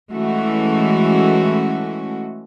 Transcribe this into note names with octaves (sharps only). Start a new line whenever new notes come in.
E3 G#3 A3 C#4 F#4